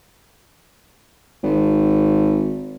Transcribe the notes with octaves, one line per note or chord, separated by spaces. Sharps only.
G#1